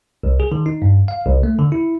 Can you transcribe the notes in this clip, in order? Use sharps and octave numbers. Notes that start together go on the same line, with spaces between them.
C2
G#4
D#3
D#4
G2
F5
C2
A3
D3
E4